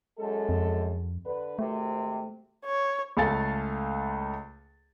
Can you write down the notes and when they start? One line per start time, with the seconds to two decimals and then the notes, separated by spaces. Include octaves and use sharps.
0.18 F#2 G#3 A4
0.49 F2
1.24 D3 B4
1.59 G#1 C3 A3
2.65 C#5
3.17 C#2 A3 A4 F5 G#5 A6